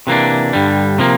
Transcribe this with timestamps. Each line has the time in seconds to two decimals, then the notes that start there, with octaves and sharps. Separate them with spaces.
0.07 C3 E3 A#3 D4
0.53 G2 D3 G3
0.98 C3 F3 A#3